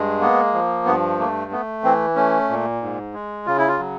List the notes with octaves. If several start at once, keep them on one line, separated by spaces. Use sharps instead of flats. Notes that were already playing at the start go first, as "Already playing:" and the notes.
Already playing: G2 G#3
A#3 B3
F3
G2 B3
A3 A#3
A3 B3
E3 C4
A3 C#4
A#2
G#2
G#3
C#3 F4
E4
F4
F#3